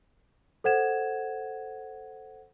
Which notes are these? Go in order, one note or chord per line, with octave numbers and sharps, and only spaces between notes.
A4 C5 F#5 G#6 E7